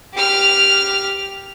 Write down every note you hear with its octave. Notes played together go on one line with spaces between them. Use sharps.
G4 F6